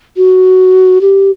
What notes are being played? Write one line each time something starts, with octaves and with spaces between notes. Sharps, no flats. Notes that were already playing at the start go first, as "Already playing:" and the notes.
F#4
G4